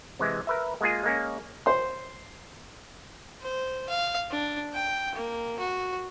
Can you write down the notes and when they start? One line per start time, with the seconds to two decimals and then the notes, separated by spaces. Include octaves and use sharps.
0.19 C3 E3 G#3
0.47 A#4 B4 E5
0.81 G#3 A#3 F4 G#4
1.04 G#3 A#3 C#4
1.66 C5 C6
3.42 C5
3.89 F5
4.31 D4
4.73 G5
5.15 A#3
5.59 F#4